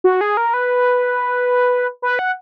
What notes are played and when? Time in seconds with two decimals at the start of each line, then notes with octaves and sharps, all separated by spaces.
0.04 F#4
0.21 G#4
0.37 A#4
0.54 B4
2.02 B4
2.19 F#5